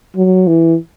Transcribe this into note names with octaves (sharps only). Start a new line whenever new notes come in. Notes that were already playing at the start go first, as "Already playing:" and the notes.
F#3
E3